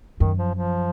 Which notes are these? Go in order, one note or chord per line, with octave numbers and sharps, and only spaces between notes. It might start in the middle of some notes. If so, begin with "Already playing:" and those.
F#2 D#3
F3
F3